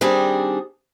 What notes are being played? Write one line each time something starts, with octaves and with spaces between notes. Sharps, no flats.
D#3 G3 C4 D4 G#4